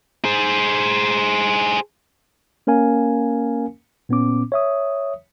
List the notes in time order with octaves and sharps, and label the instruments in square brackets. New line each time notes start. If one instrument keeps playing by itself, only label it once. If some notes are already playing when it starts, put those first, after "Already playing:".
[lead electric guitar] G#4 C5
[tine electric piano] A#3 C#4 A#4 F5 G#5
A#2 B3 C#4 D6
C#5 E5 D#6